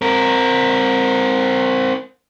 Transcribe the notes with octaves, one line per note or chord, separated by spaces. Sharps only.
C4 A#4